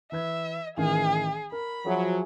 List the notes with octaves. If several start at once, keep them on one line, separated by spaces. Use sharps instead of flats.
E3 B4 E5 G#6
A1 D#3 E3 G#4
A#4 B5
F3 F#3 G#4 E5 G#5